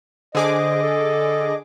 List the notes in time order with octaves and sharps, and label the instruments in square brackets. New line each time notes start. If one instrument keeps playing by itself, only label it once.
[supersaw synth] D3 G#4 D6 [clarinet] C5 [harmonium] D#5
[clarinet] A4